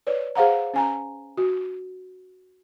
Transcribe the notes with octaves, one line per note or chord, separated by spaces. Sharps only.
B4 C#5 D5
G#4 C5 F5 F#5 A#5
C#4 G#5 A#5
F#4